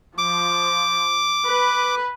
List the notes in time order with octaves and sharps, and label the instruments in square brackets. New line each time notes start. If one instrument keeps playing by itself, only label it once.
[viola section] F3 [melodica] D6
[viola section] B4